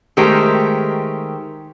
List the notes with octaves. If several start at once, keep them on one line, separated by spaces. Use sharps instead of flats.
D#3 G#3 A3 G4 A#4 C5